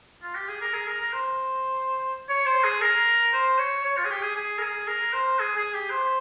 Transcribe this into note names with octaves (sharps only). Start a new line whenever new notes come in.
F4
G4
G#4
A#4
G#4
A#4
A#4
C5
C#5
C5
G#4
A#4
C5
C#5
C#5
F4
G#4
G4
G#4
G#4
A#4
G#4
A#4
C5
G#4
G#4
G4
C5